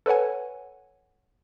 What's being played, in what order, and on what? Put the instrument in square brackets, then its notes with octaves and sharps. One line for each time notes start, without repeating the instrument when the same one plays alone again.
[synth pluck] A4 B4 C#5 F#5 G#5